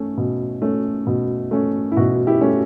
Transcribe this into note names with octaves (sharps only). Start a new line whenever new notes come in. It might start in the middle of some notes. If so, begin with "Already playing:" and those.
Already playing: A3 C#4
B2
A3 C#4
B2
A3 C#4
E4
B2 F#4
E4 G4
A3 C#4